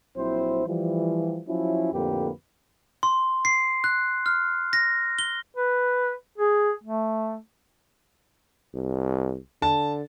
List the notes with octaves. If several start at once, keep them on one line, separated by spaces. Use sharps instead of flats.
A#1 F#3 C4 E4 C5
E3 F3 G3
F3 F#3 C#4 E4
F2 A2 D3 A#3 G4 B4
C6
C7
F#6
F6
A#6
G7
B4
G#4
A3
C2
D3 A5